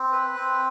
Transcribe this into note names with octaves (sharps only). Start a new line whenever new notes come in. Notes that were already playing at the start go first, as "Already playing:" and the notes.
Already playing: C4
B4
C4